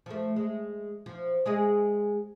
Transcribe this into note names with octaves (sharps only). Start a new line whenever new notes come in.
F3 A3
G#3
F3
G#3 G#4 D#5